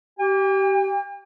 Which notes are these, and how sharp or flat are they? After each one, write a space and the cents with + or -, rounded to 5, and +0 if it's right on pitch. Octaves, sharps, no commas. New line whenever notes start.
G4 -25 G5 +45